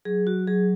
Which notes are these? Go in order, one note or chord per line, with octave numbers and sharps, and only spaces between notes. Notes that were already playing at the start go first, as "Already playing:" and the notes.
F#3 G#4
F#4
F#3 G#4